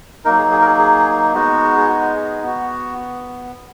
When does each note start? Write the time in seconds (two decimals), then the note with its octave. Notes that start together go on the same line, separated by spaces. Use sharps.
0.25 F#3 A#3 D#4 A#4
0.38 G#4
0.52 G#4
0.61 A#4
0.65 G#4
0.78 G#4
1.34 G#3 B3 D#4 F#4
1.77 G#4
1.89 F#4
2.16 G#4
2.43 B3 F#4